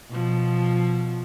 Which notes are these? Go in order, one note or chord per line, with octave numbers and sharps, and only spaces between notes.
B2 F3